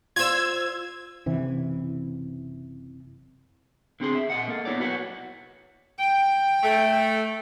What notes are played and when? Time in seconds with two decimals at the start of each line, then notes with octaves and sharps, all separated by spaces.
0.16 F4 C5 E6 G#6
1.26 F#1 C3 E3
4.00 D3 C4 G#4 C6
4.15 E5
4.30 A#2 D#5 F#5
4.48 A#3 A4
4.65 B3 E4 C#5 D5
4.80 F#4 B4 C#5 F#5
5.99 G5
6.63 A3